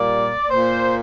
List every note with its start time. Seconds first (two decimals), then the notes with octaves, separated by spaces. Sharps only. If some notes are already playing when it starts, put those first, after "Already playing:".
Already playing: A#2 G3 A#3 D5
0.50 A#2 A#3 C5